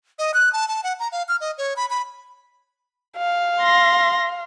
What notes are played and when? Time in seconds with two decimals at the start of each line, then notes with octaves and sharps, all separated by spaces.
0.19 D#5
0.34 F#6
0.53 A5
0.68 A5
0.83 F#5
0.99 A#5
1.12 F5
1.28 F6
1.41 D#5
1.58 C#5
1.76 B5
1.90 B5
3.18 F5
3.60 C6 A#6